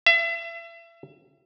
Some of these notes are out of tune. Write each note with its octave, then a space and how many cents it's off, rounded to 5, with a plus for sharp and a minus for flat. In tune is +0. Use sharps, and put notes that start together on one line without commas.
E5 +35